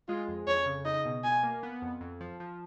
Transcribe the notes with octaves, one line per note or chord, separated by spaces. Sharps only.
G#3 F4
F2
F2 C#5
C#3
D#4 D#5
B2
B2 G#5
A#3
B3
F2
F2
F3
F3